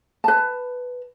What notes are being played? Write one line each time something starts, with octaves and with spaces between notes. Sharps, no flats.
B4 A5